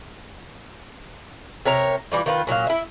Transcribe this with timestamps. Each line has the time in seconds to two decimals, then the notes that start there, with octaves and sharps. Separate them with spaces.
1.65 C3 A#4 C#5 A#5
2.12 E3 G3 F4
2.26 D#3 F4 B4
2.47 A#2 F#3 F#4 F5
2.67 E4 E5